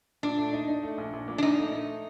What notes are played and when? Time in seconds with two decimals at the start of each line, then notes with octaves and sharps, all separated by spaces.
0.23 A#2 D4
0.37 A3
0.53 D#4
0.68 D#4
0.83 A3
0.98 A#1
1.13 A#1
1.28 A#2
1.38 D4
1.43 A#1 D#4
1.58 A3
1.73 A3